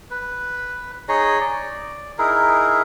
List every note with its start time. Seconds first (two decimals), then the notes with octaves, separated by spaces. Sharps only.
0.11 B4
1.09 D#4 G#4 C#5 D#5
1.40 D5
2.18 D#4 E4 G#4 A#4